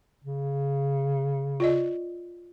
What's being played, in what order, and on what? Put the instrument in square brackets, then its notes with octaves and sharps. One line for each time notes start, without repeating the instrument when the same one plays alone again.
[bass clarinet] C#3
[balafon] F4 D5 D#5